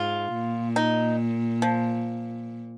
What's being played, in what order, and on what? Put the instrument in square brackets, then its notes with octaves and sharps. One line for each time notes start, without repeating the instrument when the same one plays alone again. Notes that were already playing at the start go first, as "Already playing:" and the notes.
Already playing: [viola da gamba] G#2 [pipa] F4
[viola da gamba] A#2
[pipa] D#4
F3